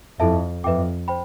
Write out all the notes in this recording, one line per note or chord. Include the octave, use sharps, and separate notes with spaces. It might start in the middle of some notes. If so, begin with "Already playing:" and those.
F2 E4 A4 E5 A5
F2 B4 E5 G5 D6
C5 G5 B5